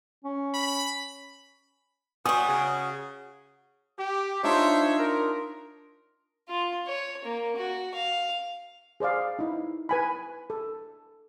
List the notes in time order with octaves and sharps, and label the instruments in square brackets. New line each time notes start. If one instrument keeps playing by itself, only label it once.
[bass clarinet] C#4
[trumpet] B5
[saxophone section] G3 B3 [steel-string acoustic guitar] F#4 C#5 [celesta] G#5 [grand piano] D#6
[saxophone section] C#3
[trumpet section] G4
[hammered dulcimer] D4 D#4 F4 [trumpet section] C5 C#5 E5
[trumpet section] A#4
[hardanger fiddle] F4
C#5
A#3
F#4
F5
[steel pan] G#4 C5 D5 F5
D#4 E4
B4 G#5 B5
A4